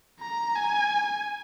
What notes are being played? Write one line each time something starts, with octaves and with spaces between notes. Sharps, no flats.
A#5
G#5